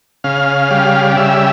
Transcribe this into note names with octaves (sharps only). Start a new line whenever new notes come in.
C#3 F5
G3
D5
C#3 E5